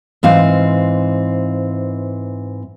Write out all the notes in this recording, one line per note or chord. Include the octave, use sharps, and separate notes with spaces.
G#2 E3 C4 F5